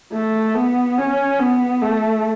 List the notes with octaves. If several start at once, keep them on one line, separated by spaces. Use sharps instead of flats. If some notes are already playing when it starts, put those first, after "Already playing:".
A3
B3
C#4
B3
A3